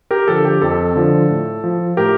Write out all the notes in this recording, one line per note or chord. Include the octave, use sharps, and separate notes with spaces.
G4 A#4
D3 F3 A4
G4
F2 A4
D3 F3
A2
F3
A2 G4 A#4